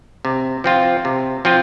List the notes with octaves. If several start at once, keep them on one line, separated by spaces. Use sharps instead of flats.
C3
F3 C4 F4
C3
F3 C4 F4